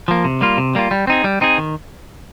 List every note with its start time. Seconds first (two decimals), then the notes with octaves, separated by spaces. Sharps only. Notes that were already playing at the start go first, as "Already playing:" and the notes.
0.08 F3 A#3
0.24 C3
0.41 G3 A#3 F4
0.58 C3
0.75 G3 A#3 F4
0.91 G3
1.07 C4 D#4 G#4
1.24 G3
1.41 C4 D#4 G#4
1.58 D#3